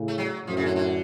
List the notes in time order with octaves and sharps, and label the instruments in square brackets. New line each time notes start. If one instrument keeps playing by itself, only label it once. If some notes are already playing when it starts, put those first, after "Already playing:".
Already playing: [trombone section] A2 C#3
[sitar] A3
F#3
[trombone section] F#2 A2 [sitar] F3
[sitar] C#3
D3
D3